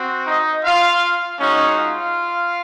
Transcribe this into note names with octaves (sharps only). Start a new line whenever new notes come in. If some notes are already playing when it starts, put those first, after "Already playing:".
Already playing: C4 F#4
D#4 D#5
F4 F5
G#3 C#4 D#4 F#4 C#5
F4 F5